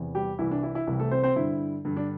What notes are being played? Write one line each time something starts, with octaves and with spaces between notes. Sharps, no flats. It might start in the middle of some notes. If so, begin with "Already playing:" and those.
Already playing: E2 C3 E3
G3 G4
C2 C3 E3 E4
D4
E4
E4
C2 C3 E3 E4
A3 A4
C4 C5
C4 C5
G2 D3 E4
G2 D3
D4